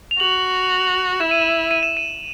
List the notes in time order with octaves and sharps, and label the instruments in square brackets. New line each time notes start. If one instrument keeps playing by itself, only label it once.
[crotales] F7
[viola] F#4 [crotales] F#7
[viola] E4 [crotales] E7
[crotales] D#7
E7
D#7
E7
D#7